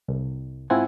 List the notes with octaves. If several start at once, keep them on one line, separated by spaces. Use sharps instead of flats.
C2
G#2 C4 E4 F4 F#5 G#5